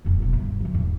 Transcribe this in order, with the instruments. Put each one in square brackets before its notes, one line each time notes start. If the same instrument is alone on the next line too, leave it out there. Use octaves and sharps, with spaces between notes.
[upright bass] F1 C2
D1 B2
G2
D3 F3
E2 G#2